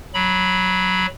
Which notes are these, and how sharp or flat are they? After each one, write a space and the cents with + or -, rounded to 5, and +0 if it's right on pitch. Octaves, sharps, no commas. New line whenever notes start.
F#3 +0 B5 -15